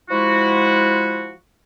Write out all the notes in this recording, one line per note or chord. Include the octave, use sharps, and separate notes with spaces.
F3 G#3 E4 F#4